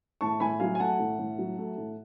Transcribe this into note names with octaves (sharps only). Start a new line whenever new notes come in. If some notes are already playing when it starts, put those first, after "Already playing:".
A2 A5 C#6
A2 G#5 B5
F#3 F5 G#5
G#5
A3 F#5 A5
A2
A2
F#3
A3
A2